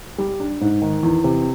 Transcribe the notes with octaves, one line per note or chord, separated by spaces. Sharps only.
G3
D4
G#2
D#3
E2
C3